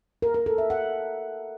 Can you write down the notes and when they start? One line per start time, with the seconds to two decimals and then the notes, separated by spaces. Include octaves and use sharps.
0.22 A#4
0.34 A#4
0.46 A4
0.58 E5
0.70 F#5